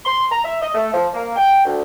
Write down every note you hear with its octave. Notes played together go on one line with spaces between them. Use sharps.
C6
A#5
E5
D#5
A3
F3
A#3
G5
D2